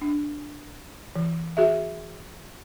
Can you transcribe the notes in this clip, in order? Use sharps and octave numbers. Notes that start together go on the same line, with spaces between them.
D4
E3
F#4 G#4 E5